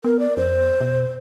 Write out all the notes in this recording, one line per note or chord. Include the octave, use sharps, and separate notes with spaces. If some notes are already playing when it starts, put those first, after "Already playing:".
B3 A#4
D5
F2 C5
B2